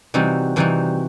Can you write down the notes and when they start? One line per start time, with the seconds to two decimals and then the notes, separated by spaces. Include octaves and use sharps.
0.14 C3 E3 G3 D#4 F#4
0.56 C3 E3 G3 D#4 F#4